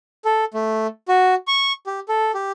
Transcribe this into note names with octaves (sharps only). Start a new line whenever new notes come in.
A4
A3
F#4
C#6
G4
A4
G4